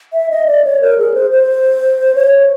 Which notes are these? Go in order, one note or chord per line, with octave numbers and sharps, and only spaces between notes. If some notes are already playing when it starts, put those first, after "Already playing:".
E5
D#5
D5
C#5
A#4
G#4
C5
C5
C#5